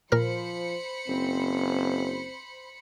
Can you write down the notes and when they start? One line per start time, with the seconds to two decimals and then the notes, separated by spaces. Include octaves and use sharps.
0.12 A#2 F3 A#4 C5 B5 F6 C#7
1.08 F#1 C4